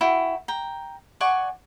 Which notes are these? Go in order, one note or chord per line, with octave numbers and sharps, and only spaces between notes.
E4 F#4 G5
G5 A#5
D5 F#5 G#5 C#6